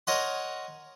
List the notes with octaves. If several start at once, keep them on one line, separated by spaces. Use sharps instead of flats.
A#4 C#5 D#5 F#5 C6